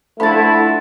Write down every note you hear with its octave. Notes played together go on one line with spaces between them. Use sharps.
D3 F3 A3 E4 F#5 B5 A6